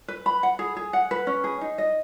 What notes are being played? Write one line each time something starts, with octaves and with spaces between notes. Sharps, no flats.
B4
B5
F#5
G#4
G#4
F#5
B4
C#4
G#4
D#4
D#5